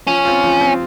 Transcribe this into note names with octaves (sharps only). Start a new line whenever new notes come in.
F3 C#4
C4 F4
F3
C4 F4